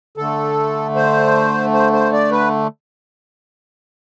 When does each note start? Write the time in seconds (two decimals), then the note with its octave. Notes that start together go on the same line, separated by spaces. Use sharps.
0.17 D3 A3 A4
0.96 C5
1.74 C5
1.93 C5
2.13 D5
2.31 B4